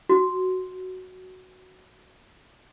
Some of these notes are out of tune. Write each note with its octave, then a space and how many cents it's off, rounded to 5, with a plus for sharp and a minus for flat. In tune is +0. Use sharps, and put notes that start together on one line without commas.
F#4 +5